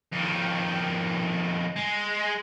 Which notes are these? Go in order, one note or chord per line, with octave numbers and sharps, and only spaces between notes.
F2 D#3
G#3